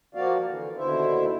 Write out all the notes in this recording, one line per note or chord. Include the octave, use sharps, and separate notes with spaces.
F3 A#3 F#4 D5 F5
D3 E3
D#2 B2 D3 E4 C5 E5